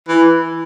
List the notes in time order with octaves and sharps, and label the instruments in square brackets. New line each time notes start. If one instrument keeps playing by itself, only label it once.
[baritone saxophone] E3